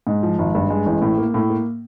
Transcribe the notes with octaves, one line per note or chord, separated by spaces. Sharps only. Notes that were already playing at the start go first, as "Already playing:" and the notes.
G#2
F3
G#1
G2
G#3
A1
A2
A#3
A2
A#3